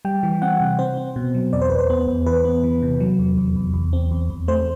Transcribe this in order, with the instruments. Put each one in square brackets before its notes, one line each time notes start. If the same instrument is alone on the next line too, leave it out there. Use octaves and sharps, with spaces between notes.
[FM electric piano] G3 G5
E3
C4 F#5
C3
C4 C5
C4
B2
F#3
E2 D5
C5
E2 B4
C5
B3
E2
E3 B4
B3
E3
C3
F#3
E2
E2
E2
E2
C4
E2
E2
A3 C5